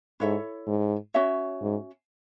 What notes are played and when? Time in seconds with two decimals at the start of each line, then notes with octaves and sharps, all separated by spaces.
0.20 G#2 E4 A4 C#5 E5
0.67 G#2
1.14 C#4 F#4 C#5 E5
1.62 G#2